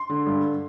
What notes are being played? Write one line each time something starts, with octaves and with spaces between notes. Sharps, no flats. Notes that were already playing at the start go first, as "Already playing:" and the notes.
Already playing: C6
D3
G2